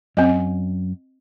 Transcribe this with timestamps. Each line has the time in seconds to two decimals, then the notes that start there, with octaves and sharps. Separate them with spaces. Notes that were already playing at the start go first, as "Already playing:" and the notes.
0.17 F#2 C4 D#5